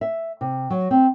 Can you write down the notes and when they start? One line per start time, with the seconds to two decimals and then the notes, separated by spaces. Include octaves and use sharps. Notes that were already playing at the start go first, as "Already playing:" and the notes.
0.01 E5
0.41 C3
0.70 F#3
0.91 C4